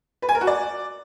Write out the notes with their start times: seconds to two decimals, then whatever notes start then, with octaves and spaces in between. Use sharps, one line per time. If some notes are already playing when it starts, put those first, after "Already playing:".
0.22 B4
0.29 G#5
0.35 A#4
0.41 F#4
0.47 D5